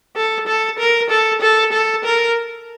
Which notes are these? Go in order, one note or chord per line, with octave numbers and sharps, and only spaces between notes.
A4
A4
A#4
A4
A4
A4
A#4